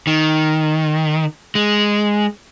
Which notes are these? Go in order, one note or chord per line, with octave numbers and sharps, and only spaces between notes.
D#3
G#3